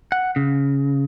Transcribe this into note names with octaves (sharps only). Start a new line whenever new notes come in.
F#5
C#3